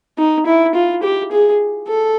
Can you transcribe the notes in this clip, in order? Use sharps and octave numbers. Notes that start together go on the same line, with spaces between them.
D#4
E4
F4
G4
G#4
A4